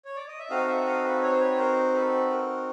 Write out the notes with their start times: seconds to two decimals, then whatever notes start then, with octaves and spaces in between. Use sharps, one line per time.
0.05 C#5
0.16 D5
0.28 D#5
0.39 E5
0.50 C4 D#4 F#4 A4 D#5 F5
0.68 E5 F#5
0.86 D#5 F5
1.04 A4 B4
1.22 C#5
1.31 C5
1.40 B4 C#5
1.58 A#4 C5
1.94 A4 B4
2.30 A#4